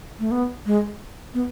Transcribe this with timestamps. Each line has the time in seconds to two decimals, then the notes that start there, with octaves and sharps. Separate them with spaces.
0.19 A3
0.31 B3
0.66 G#3
1.34 B3